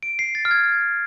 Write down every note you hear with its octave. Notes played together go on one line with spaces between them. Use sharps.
D7
C7
A6
F6
G#6